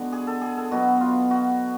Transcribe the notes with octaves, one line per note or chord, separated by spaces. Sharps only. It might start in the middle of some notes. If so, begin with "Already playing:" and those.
Already playing: D3 G#3 B3 F#4
G#4
A4
G#4
A4
B2 F#3 B3 F#4
F4
F#4